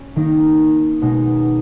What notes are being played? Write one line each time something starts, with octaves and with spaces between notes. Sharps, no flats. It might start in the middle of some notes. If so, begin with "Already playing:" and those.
Already playing: C#4
D#3 A#3 D#4
B2 G#3 D#4